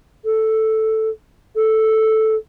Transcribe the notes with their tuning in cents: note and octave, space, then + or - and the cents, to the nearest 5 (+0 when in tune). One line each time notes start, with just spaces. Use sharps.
A4 +0
A4 -5